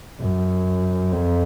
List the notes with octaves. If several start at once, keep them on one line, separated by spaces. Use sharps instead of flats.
F#2
F2